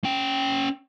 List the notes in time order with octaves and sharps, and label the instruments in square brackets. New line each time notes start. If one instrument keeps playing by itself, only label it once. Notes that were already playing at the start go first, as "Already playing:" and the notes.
[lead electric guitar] C#4 G5